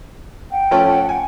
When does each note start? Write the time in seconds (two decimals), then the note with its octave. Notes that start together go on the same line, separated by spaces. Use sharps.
0.50 F#5 G5
0.71 F3 A3 C#4
1.09 G#5